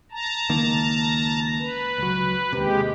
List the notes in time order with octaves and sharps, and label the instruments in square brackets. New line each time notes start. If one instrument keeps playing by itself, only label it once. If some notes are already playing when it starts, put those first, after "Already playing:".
[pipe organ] A5 A#5
[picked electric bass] C#2 D#3 A#3
[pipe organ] B4
[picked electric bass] C#2 F#3
[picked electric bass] D#2 C3 [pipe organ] G#3 G4